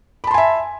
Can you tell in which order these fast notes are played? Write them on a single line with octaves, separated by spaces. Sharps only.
B5 A5 C6 G#5 E5